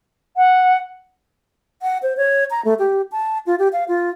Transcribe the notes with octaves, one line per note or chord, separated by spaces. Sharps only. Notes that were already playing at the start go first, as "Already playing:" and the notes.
F#5
F#5
C5
C#5
A#5
A3
G4
A5
F4
G4
F5
F4